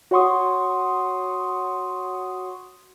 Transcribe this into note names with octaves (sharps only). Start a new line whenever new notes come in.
F#4 C#5 F#5 C6 C#6 D#6